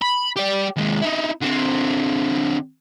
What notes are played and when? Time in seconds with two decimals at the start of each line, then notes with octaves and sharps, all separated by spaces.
0.02 B5
0.37 G4 D5
0.77 D#2 G#3
1.01 D#4 E4
1.41 D3 C4